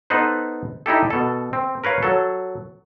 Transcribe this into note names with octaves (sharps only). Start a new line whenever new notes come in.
B3 D#4 A4 B4 C5
D#4 E4 G4 A4
B2 A4
C4
A#4 B4 C#5 F5
F#3 A4